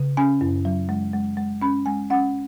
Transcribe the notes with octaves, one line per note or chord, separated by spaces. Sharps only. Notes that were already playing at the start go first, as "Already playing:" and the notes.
Already playing: C#3
C#4 G#5
F#2
F#3
G#3
G#3
G#3
C#4 B5
G#3 G#5
C#4 F#5